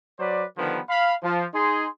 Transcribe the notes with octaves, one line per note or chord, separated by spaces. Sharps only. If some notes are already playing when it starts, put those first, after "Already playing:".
F#3 B4 C5 D5
D3 D#3 F3 G3 B3 B4
F5 B5
F3
D#4 G#4 C6